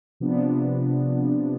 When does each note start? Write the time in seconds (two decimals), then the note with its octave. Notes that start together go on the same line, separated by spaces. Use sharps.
0.20 C3 F3 B3 D4